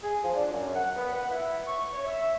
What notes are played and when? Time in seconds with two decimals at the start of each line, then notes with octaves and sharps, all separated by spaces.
0.03 G#4
0.23 F3
0.36 D4
0.52 F#2
0.75 F#5
0.96 B3
1.15 F#5
1.31 E4
1.67 C#6
1.93 C#5
2.05 E5